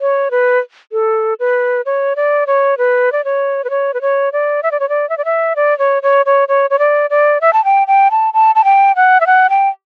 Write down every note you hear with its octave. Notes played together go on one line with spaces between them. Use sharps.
C#5
B4
A4
B4
C#5
D5
C#5
B4
D5
C#5
B4
C#5
B4
C#5
D5
E5
D5
C#5
D5
E5
D5
E5
D5
C#5
C#5
C#5
C#5
C#5
D5
D5
E5
A5
G5
G5
A5
A5
A5
G5
F#5
E5
F#5
G5